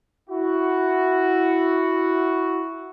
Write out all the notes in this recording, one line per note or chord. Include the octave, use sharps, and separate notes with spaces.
E4 F#4